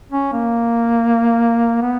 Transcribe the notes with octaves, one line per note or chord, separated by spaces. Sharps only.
C#4
A#3
B3